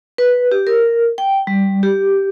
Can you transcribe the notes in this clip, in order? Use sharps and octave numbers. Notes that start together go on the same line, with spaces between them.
B4
G4
A#4
G5
G3
G4